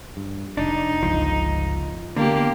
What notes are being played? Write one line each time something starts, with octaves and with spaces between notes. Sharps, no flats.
G2
F1 D4 D#4
G1 C#2 F3
D3 A#3 B3 G4